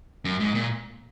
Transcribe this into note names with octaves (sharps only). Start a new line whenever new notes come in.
F#2
G#2
A#2